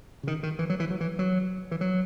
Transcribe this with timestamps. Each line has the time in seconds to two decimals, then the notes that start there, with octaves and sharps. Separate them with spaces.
0.23 C#3
0.27 D#3
0.43 D#3
0.59 E3
0.70 F#3
0.80 E3
0.90 F#3
1.01 E3
1.19 F#3
1.71 E3
1.81 F#3